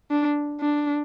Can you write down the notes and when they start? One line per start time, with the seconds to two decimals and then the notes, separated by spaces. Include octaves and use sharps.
0.11 D4
0.61 D4